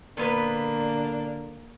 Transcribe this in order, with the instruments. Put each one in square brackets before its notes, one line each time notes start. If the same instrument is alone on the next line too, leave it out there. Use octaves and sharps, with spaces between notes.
[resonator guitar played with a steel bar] A#2 B3 B4 [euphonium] D3 [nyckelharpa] A#3 [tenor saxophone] D4